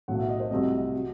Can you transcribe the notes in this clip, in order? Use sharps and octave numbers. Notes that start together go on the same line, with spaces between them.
B1 A2 F#3 A3 F#5
E5
D#5
C5
C2 C3 F#3 A3 D#5
F#3